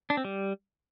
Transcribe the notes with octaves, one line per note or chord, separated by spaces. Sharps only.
D4
C4
G3